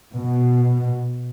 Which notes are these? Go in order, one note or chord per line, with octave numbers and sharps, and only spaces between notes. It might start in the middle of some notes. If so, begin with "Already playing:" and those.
B2